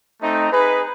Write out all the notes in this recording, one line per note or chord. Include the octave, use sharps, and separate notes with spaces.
A3 C4 D#4
D#4 G#4 B4